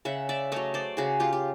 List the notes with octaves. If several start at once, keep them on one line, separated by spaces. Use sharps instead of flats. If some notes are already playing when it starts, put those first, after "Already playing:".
C#3 E5 F#5
D5 E5
F#3 A3 C#5 D#5
C5 D5
C#3 F#4 G#4
F4 G4
G4